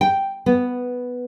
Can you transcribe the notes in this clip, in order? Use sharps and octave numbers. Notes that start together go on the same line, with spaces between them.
G5
B3